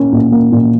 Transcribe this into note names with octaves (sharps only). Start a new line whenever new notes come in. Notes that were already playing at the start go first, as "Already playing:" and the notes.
Already playing: A#2 A#3 C#4
A#2
A#3
A#2